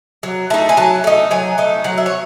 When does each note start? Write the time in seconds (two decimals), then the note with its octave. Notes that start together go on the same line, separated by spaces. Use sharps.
0.23 F#3
0.50 A3 A5
0.54 D#4
0.69 G#5
0.77 F#3 A5
1.04 A3 D#4
1.31 F#3 G#5
1.58 A3 D#4
1.84 F#3 F#5
1.97 E5
2.06 C#5